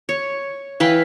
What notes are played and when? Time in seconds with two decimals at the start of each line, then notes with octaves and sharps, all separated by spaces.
0.09 C#5
0.80 E3 B4 F5 G5